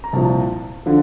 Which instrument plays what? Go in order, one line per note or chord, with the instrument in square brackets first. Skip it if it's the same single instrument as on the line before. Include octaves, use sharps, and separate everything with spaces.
[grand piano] A#5
C2 A#2 F3 A5
D3 F3